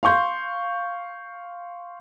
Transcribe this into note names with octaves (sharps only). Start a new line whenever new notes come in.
F5 C6 C#6 G6